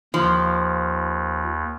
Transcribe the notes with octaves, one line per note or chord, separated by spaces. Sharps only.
D#2 F3